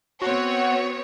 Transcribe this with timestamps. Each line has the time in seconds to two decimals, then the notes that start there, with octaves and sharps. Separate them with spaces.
0.22 B3 C4 F#4 C#5